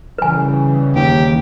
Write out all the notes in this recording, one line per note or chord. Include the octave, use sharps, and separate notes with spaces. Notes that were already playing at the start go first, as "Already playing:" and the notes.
C#3 E3 G3 B4 G#5
D#2 G4